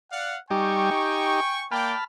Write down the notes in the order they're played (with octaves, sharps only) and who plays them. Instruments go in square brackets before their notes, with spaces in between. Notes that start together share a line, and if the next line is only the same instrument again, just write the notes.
[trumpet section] D5 F5 F#5
[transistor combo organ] G3 D#4 G4 [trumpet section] G5 G#5 C#6
[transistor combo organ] D#4 G4
[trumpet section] A#3 D5 G5 [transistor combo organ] A5 B5 F6